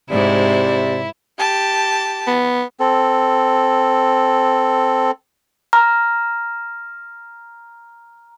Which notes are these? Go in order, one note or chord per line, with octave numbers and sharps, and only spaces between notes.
G#2 C3 E4 D5
G4 A5
B3
C4 A4
A#5 F6